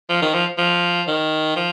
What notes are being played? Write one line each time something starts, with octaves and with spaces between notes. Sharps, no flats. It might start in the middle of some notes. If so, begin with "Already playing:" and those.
F3
D#3
F3
F3
D#3
F3